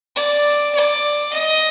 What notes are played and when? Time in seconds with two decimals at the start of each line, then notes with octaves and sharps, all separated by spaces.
0.16 D5
0.75 D5
1.33 D#5